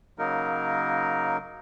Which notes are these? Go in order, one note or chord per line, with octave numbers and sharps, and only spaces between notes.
C#3 F#3 A#3 D#4 A#4